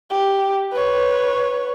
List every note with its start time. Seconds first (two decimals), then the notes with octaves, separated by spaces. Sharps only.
0.10 G4
0.73 B4 C#5